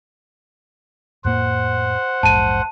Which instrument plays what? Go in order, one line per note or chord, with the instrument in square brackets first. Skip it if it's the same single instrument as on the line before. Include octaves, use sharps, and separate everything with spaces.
[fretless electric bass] F2 A2 A#3 [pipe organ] C5 F#5
[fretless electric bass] A#1 E2 G#2 [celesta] A5 D#7